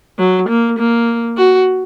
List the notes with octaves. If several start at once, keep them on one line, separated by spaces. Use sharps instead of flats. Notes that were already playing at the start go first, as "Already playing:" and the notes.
F#3
A#3
A#3
F#4